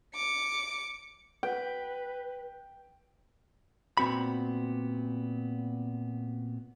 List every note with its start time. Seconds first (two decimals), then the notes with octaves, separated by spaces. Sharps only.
0.15 D6 C#7
1.43 B4 G5
3.97 A#2 B3 C4 F#4 B5